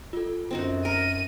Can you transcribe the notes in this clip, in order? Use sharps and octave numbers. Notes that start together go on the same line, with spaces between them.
F4 A4
F#2 C4 D#4 F#4
A#4 D#7